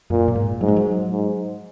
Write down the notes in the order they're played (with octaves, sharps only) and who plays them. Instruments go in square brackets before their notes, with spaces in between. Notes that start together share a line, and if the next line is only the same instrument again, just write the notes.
[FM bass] F#2 [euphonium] A#2
[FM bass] A#2
G#2
[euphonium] G#2 [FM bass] F#3
[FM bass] G#3
F#3
[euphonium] G#2